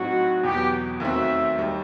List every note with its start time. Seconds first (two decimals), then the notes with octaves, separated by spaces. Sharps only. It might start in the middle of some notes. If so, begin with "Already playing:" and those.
Already playing: A2 F#3 C4 D#4 F#4
0.43 E2 B2 F#3 B3 G4
1.00 D#2 D#3 A3 C4 F#4 E5
1.58 D#2 D#3 G3